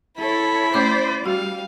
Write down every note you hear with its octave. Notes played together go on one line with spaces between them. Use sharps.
E4 A4 C#5 B5
A3 C#4 C5 D5 D6
G3 F#4 F5